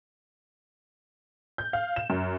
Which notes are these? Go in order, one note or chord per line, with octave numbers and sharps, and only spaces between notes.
G6
F5
E7
F#2